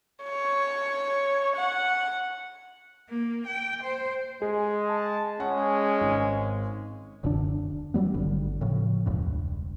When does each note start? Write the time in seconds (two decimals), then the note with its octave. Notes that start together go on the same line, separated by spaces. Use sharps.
0.23 C#5
1.56 F#5
3.09 A#3
3.47 G5
3.83 C5
4.42 G#3 G#4
4.89 A5
5.40 G#3 C#4 F#5
6.01 G#1
7.23 D#1 F#2 D3 D4
7.94 E3 F#3 G3 B3
8.14 G#1 G2 D3
8.61 A2 C#3 F3
9.06 E1 C#2 G2